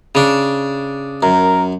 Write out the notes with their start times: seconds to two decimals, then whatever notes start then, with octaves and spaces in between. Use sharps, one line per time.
0.15 C#3 D4
1.23 F#2 A#4